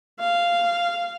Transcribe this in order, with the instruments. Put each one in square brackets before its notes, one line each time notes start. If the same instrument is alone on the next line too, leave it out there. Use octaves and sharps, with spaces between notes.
[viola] F5